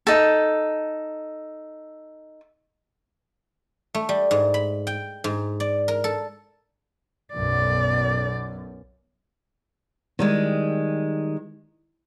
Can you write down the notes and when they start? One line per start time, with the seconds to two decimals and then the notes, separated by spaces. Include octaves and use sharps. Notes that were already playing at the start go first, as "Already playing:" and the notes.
0.07 D#4 A4
3.94 A3
4.09 G3
4.31 G#2
4.54 B5
4.87 G5
5.24 G#2
5.60 D5
5.88 A#4
6.04 A4
7.34 B1 F#2 D5
10.19 D#3 G3 G#3